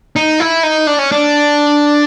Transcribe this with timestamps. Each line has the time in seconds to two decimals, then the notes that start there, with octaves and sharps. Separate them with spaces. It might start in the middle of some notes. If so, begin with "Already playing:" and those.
0.16 D#4
0.40 E4
0.63 D#4
0.87 D4
0.99 C#4
1.12 D4